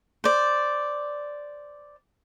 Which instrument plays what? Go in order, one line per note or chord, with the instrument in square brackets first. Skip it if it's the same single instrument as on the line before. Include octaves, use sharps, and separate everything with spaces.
[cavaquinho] C5 D5